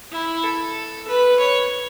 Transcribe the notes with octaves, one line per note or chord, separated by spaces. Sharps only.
E4
A4
B4
C#5